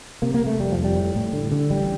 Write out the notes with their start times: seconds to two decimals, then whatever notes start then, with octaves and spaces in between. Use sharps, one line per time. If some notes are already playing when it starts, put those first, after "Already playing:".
0.22 C3 A#3
0.34 A#3
0.41 C3
0.47 A3
0.59 F1 G3
0.72 F3
0.78 F2
0.85 G3
0.97 A2
1.15 A2
1.33 D3
1.52 D3
1.70 A1 G3